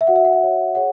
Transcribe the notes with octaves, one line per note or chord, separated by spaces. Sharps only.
E5
F#4 C#5 F#5
E5
F#5
E5
F#4 C#5
G#4 C#5 F#5